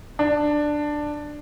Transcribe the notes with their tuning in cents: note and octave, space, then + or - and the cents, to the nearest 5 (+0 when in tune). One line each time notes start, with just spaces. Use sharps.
D4 +10